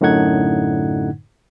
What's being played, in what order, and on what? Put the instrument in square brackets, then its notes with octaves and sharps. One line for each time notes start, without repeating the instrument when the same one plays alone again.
[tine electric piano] F#2 A2 D3 D#4 F#5 G#6